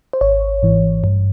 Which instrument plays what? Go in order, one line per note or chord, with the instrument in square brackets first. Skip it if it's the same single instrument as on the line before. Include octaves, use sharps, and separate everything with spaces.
[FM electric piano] C5
G#1 C#5
G#2 E3
G2